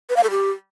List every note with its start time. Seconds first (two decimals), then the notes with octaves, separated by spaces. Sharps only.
0.10 B4
0.16 F5
0.23 A4
0.30 G4